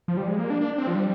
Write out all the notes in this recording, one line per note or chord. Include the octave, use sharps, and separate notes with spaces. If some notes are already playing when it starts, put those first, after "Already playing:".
F3
G3
G#3
A#3
D4
D4
C4
F3
G3